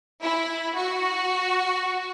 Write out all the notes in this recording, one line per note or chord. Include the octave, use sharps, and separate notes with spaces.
E4
F#4